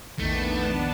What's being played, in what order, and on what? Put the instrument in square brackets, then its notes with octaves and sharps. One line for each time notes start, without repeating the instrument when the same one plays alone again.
[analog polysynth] A#1 E2 D#3 [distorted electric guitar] A3 [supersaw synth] B3 D4 A5